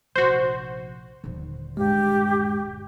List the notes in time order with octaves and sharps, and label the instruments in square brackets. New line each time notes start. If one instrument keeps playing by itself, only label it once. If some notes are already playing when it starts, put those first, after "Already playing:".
[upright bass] F1 A#1 [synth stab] F#4 C5
[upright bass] D#1 D3
[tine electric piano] G2 G#3 [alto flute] G4